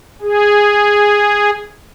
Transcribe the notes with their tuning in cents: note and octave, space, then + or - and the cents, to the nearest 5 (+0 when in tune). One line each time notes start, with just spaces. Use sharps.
G#4 -10